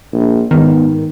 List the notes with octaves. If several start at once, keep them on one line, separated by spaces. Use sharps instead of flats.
A#1
G#2 D#3 B3